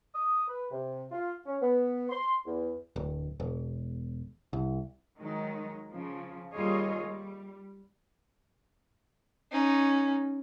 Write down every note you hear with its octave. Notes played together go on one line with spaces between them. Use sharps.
D#6
B4
C3
F4
C#4
B3
C6
E2
D1
E1
C2
D#3 F#3 G#3 D#4
C#3 F3
D#2 G3 F4 G#4 C#5 D#5
G3
C#4 D#4